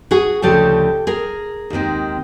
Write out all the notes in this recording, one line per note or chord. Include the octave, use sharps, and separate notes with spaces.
F#4 G#4
D2 C#3 F3 A3 C#4 G4 A4
G#4 A#4
D#2 D#3 G#3 C4